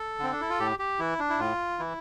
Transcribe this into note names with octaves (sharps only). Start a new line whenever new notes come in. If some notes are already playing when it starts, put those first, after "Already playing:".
Already playing: A4
D3 C4
D4
E4
F4
A2 G4
G4
E3 E4
D4
E4
A2 F4
E3 E4